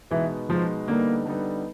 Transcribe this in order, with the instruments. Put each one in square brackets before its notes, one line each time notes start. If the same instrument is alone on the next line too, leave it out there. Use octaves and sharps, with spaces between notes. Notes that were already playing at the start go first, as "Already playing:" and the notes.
[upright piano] B2 G#3 B3 D#4 [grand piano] E3
[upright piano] B2 G#3 B3 D#4 [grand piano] F3
[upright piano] D3 G3 B3 D#4 [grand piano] A#3
[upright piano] D3 G3 B3 D#4